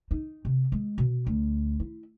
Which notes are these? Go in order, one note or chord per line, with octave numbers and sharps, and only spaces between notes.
D#4
C3
G#3
B2
D2
E4